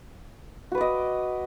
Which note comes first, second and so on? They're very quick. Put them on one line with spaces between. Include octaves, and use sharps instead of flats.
F#4 B4 D5 D#5